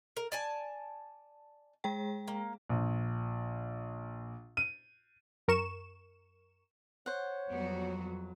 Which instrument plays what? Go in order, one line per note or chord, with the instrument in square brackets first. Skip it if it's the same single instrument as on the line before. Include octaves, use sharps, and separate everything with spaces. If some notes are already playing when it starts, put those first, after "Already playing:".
[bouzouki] A#4
D5 G#5 A5
[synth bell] G#3 G#4 G5
[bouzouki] A#3
[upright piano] A#1
D#7
[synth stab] F#2 A#4 C#6 E7
[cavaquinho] C5 F#5 [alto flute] C#5
[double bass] F2 F#3 [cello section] G3 B3 F#4